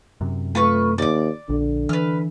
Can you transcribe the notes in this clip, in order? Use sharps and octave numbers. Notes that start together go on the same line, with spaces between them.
F#2 C3
A3 F4 B4 C#6
D#2 D5 D6
A#1 D3
E3 B4 F6